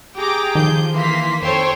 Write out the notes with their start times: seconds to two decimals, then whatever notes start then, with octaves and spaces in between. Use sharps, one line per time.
0.16 G4 G#4 G5 A#5 D6
0.55 D#3 F3 G6
0.94 E3 A#3 C6 B6
1.42 F2 A4 C5 C#5 G5 C6